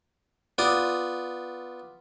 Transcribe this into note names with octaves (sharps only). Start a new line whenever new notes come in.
B3 F4 D5 D#6